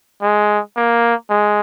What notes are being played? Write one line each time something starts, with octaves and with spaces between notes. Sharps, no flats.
G#3
A#3
G#3